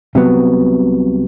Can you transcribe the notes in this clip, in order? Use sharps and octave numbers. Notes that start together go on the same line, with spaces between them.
C2 C3 F#3 B3